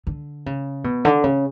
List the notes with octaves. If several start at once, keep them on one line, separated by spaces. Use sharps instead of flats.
D3
C#3
B2
D3
C#3